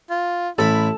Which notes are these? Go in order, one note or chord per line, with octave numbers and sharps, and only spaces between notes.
F4
A1 E4 A4 B5